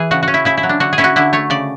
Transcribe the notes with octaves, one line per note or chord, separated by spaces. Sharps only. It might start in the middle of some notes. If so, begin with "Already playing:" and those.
Already playing: E3 G#4
C#3 F#4
F#4
C#4
E4
C#3 E4
E4
F#3
D4
D3 F#4
G#4
C#4 E4
F#4
D3 E4
A3 C#5
C#3 D5